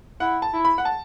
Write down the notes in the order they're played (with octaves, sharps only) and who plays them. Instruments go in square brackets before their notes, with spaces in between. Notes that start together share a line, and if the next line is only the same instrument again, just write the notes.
[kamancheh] E4 [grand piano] F#5
[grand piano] A5
[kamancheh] E4
[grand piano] B5
F#5
A5